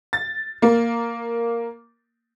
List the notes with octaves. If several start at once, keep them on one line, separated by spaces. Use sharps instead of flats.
A6
A#3